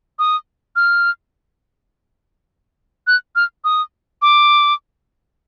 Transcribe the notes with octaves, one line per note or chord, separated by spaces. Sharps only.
D#6
F6
F#6
F6
D#6
D6